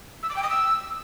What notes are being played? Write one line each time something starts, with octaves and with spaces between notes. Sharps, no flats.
E6
D6
G5
D#6
E6